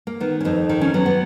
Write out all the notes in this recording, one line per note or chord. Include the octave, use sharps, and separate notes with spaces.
A#3
D#3 B3
C#4
F2 D#4
D#3
C#4
F#3 B3
B3